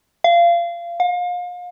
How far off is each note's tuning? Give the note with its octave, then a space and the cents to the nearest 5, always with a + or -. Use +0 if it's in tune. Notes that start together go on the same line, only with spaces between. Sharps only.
F5 -25
F5 +35